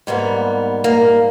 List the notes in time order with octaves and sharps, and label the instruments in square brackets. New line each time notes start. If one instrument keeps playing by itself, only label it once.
[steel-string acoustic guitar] G#2 G3 A#3 B3
A#3